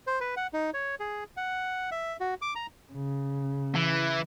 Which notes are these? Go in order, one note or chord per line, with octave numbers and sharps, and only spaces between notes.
C5
B4
F#5
D#4
C#5
G#4
F#5
E5
F#4
D6
A#5
C#3
E3